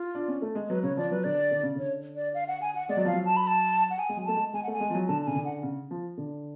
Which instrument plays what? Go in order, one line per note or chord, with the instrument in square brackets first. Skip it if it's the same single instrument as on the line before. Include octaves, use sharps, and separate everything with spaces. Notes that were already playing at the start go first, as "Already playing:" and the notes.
Already playing: [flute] F4
[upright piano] D4
C#4
A3
G#3
[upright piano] F#3 [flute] B4
[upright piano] C#3 [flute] C#5
[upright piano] F3 [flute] D5
[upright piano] F#3 [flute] B4
[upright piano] D3 [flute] D5
[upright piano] D3
C#3
[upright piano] D3 [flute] C#5
[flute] D5
F5
F#5
G#5
F#5
[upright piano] G#3 [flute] D5
[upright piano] F#3
[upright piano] F3 [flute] F5
[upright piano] F#3
[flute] A5
B5
A5
F#5
G#5
[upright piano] G#3
F#3
[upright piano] A3 [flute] A5
[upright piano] G#3
[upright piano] G#3 [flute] G#5
[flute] F#5
[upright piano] A3 [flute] G#5
[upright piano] G#3
F3
F#3
[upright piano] D3 [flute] A5
[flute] A5
[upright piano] C#3 [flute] G#5
[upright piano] D3
[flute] F#5
[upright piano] C#3
F3
D3